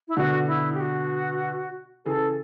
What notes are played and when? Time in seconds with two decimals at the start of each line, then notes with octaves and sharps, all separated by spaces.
0.08 E4
0.17 B2 D3 F#4
0.47 E4
0.74 G4
0.80 F#4
2.05 C#3 E3 A4